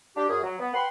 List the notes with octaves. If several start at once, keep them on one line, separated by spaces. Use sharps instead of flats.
D4 G4
F#2 G#4
F#3
B3
B4 F#5 G5 B5 C6